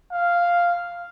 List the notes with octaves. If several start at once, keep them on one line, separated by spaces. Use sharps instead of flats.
F5